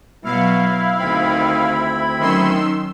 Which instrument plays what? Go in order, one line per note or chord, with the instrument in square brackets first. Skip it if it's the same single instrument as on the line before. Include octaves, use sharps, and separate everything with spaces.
[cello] B2 F#3 [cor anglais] E4 [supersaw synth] F5
[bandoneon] D2 C4 B5 [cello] D#3
[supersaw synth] D#3 C6 E6 [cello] F#3 C#4